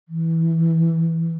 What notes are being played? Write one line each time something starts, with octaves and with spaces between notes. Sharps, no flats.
E3